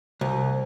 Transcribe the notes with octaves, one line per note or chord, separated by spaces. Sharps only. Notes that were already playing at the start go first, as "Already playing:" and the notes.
C2